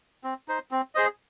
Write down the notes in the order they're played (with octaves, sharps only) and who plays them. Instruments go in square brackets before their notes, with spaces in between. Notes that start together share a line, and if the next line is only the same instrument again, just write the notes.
[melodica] C4
D#4 C5
C4
G#4 C5 D#5